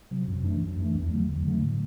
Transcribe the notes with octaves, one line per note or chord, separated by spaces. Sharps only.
C3 F#3
F#2
E3 A3 D4
F#2
E3 A3 D4
E2
D3 F#3 A3
E2
D3 F#3 A3
A2